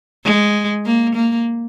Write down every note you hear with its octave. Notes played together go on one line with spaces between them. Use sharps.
G#3
A#3
A#3